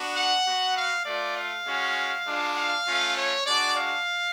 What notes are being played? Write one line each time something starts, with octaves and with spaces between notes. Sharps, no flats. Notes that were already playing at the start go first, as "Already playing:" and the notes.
Already playing: B3 D4 F#4
F#5
B3 F#4
F5
A3 F4 D5
F5
G#3 C#4 F#4
G#3 D4 F4
F5
A3 C#4 F4
C#5
G#3 D4 F#4 D5
F5